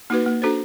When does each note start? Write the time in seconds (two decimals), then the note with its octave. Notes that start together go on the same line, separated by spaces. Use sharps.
0.10 A#3 D#4 F#4 B4
0.26 A#3
0.42 D4 F#4 A4 C5